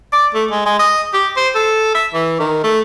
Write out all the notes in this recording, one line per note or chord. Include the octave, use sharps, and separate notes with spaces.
D5
A3
G#3
G#3
D#5
G4
C5
A4
E5
E3
D#3
A3